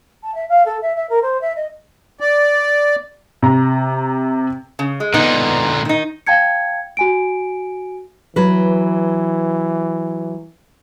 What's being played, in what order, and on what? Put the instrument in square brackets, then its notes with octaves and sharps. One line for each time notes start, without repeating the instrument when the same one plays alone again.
[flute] A5
E5
F5
A4
E5
E5
A#4
C5
E5
D#5
[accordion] D5
[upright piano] C3 A#5
[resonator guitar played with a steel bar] C#3
G#3
[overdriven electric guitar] A#2 D3 [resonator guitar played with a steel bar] B3 D#4
[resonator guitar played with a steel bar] D#3 D#4
[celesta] F5 G5 A5 G#6 C#7
F#4 G#5 D7
[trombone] E3 [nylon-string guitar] F#3 B4